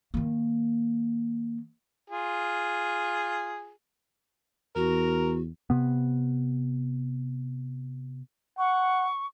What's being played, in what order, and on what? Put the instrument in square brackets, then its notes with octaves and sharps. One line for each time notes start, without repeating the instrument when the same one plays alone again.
[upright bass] D#3 A#3
[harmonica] F4 G#4
[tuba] E2 [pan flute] F#4 [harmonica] A#4
[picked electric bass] C3 B3
[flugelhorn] F#5 [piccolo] C#6